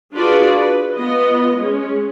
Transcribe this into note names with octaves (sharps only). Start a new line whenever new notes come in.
D4 F4 F#4 G#4 B4 D5
B4
B3 F4 D#5
G#3 C#4